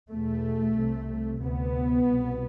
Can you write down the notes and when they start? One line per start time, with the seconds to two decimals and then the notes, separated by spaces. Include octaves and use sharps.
0.10 E2 B2 A3
0.76 C2 C3
1.40 D2 C3 B3
2.06 C2 B2